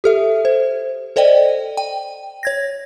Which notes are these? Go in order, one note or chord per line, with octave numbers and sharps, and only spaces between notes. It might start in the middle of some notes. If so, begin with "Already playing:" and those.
G4 A4 E5
C5
A4 C5 D5 D#5 G5
G5
C#5 G#6 A#6